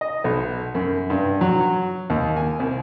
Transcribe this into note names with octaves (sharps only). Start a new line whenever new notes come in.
D#5
B1
F#2
G2
F#3
D#2
G#5
C2